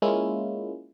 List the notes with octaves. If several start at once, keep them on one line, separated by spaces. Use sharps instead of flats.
G#3 A#3 C#4 E4 F4